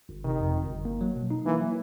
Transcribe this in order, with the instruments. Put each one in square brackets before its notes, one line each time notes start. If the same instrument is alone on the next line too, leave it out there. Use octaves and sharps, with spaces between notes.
[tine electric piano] G1
[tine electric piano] C3 [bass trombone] D#3
[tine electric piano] F2
G1
G1
A#3
F#3
B2
D#4
[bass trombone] E3 [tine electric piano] A#3
[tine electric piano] F#3